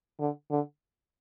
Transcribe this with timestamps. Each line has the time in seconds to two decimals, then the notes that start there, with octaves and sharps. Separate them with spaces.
0.20 D3
0.50 D3